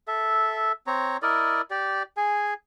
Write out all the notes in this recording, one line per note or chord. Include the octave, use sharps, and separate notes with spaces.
A4 E5
C4 C#5 A#5
E4 A#4 D5 D#5
G4 D5
G#4 G#5